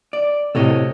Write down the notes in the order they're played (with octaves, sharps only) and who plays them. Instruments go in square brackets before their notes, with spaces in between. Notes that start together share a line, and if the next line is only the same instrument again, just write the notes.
[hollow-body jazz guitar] D5
[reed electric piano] A2 C3 [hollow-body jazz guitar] A4 C#5 D#5